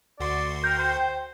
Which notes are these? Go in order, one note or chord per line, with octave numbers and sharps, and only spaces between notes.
D2 F#4 D5 C6
A#4 G5
C5